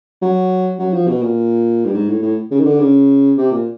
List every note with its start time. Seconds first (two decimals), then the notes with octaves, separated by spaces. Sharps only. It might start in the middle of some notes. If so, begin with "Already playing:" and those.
0.22 F#3
0.79 F#3
0.93 F3
1.08 B2
1.22 A#2
1.85 G2
1.94 G#2
2.08 A2
2.22 A2
2.51 C#3
2.59 D#3
2.65 D3
2.80 C#3
3.37 C3
3.51 A#2